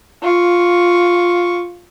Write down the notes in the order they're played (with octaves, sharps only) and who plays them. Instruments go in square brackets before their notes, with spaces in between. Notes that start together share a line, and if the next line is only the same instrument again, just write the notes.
[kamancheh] F4 C#6